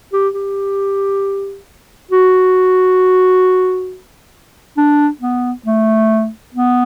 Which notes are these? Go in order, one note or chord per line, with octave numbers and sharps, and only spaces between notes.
G4
G4
F#4
D4
B3
A3
B3